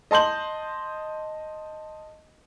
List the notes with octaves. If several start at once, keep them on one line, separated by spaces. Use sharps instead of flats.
D#5 A5 C6 G6 F#7